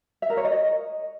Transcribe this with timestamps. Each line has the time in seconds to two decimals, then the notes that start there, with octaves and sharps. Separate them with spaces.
0.22 E5
0.30 A#4
0.37 C#5
0.45 D#5